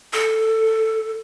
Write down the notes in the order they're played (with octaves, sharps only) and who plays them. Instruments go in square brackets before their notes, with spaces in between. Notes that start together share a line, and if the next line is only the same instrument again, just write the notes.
[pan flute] A4